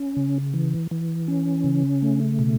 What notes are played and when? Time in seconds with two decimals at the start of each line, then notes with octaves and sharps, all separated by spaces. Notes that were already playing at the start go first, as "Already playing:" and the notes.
Already playing: C#4
0.17 C#3
0.54 E3
0.91 E3
1.28 C#4
1.64 C#3
2.02 A3
2.39 B2